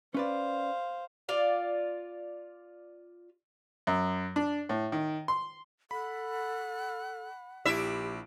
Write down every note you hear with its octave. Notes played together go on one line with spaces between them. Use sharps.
C#4 B4 C5 D5 F5
F4 D5 F5
F#2
D4
A2
D#3
C6
A4 F#5 B5
A#1 E4 G4 E5 D7